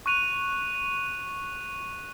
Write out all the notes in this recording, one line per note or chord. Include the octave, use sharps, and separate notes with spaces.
C#6 F#6 D#7 F7